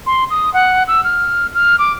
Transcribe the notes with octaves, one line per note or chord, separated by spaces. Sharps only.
C6
D#6
F#5
E6
F6
F6
D6